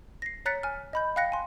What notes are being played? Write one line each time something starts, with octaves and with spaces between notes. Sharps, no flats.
A#6 C7
C#5 A#5 F#6 A6 B6 C#7
G#5 F6
D#5 B5 G6
F5 G5 F#6 A#6 C#7
G#5 C6